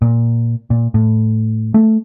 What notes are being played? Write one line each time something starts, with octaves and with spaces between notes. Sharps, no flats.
A#2
A#2
A2
A3